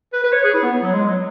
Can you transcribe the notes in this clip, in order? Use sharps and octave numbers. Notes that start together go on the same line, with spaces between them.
B4
B4
C#5
G#4
E4
B3
F#3
G#3
F#3